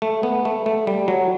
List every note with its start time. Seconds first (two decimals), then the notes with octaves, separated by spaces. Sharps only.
0.02 A3
0.23 B3
0.45 A3
0.66 A3
0.87 G3
1.08 F#3